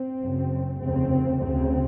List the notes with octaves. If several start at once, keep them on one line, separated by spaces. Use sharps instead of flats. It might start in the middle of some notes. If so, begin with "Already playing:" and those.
Already playing: C4
F#1 F#2 C#3
F1 D#2 C#3 C4
D2 C#3 C4